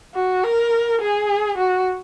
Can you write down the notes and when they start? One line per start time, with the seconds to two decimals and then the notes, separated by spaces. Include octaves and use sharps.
0.14 F#4
0.44 A#4
1.01 G#4
1.58 F#4